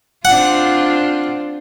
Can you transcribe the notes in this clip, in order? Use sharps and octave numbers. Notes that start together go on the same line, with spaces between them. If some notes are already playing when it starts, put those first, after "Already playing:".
C4 D4 F4 F#5